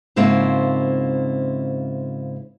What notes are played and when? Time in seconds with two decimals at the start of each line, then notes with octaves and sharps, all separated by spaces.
0.16 G#2 C#3 A#3 C4 E4 F4